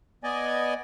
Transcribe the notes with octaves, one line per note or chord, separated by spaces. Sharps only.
B3 D5 D#5 G#5